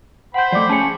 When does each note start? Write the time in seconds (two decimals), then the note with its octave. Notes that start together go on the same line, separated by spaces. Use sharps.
0.34 C5 F#5 G5 B5 G6
0.52 F3 A3 D5 D6
0.69 C#4 G#4 A5 C#7